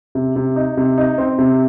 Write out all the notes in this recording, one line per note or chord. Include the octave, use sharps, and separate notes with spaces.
C3
C3
D#4
C3
D#4
C4
C3